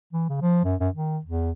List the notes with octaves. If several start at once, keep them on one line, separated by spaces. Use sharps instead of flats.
E3
C#3
F3
F#2
F#2
D#3
E2